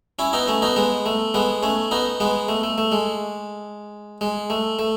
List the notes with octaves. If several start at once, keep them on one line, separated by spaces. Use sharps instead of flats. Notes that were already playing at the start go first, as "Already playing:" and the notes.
C#4 E4
B3 D#4
A3 C#4
B3 D#4
G#3 B3
A3
G#3 B3
A3 C#4
B3 D#4
G#3 B3
A3
A3
A3
G#3
G#3
A3
A3